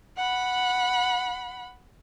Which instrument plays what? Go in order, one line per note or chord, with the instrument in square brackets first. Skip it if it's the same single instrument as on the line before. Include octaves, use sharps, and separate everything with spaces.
[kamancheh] F#5 B5